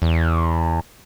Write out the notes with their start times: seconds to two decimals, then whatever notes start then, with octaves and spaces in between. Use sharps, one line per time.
0.02 E2